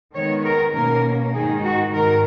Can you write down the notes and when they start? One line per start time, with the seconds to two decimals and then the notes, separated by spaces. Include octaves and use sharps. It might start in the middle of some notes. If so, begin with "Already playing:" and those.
0.15 D#3 G#3 B3 C#5
0.46 A#4
0.75 B2 A#3 C#4 A#4
1.34 G#2 D#3 G#3 D#4 G#4
1.63 F#4
1.93 G#2 D#3 A#4